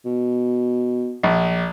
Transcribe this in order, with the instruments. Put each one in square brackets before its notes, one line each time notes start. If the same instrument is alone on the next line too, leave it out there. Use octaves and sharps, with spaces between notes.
[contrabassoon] B2
[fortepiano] A#1